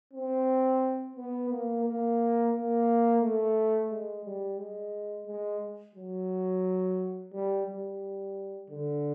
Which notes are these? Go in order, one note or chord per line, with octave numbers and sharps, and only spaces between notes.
C4
B3
A#3
A#3
A#3
A3
G#3
G3
G#3
G#3
F#3
G3
G3
D3